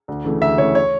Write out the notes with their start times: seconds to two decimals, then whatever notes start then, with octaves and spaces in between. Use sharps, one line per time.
0.08 D2
0.25 C#3 E3 A3
0.41 D2 E5
0.58 C#3 E3 A3 C#5
0.75 C#5